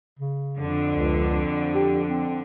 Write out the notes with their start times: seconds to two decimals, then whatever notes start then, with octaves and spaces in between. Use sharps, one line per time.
0.19 C#3
0.57 F2 D3 D4
0.93 C#2
1.75 G4
2.09 C4